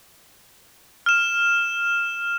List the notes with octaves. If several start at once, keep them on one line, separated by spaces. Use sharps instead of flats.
F6 E7